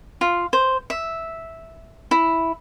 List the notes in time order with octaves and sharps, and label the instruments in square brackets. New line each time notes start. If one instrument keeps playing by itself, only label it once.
[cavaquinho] F4
C5
E5
E4